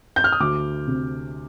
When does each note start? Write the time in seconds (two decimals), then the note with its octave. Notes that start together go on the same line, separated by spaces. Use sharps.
0.16 G6
0.24 F6
0.32 D#6
0.40 D2 D6
0.87 C3